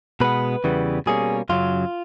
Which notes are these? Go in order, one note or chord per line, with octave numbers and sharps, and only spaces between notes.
B2 G#3 B3 B4
E2 C#3 E3 G3 B3
B2 G3 A#3 C#4 G#4
F#2 C#3 F#3 F4